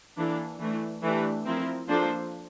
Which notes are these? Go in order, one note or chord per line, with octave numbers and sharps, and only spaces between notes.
E3 A#3 D4 A4
E3 A3 D4
E3 A3 D4 G4
F3 C4 E4 A#4
F3 A#3 D4 A4 C5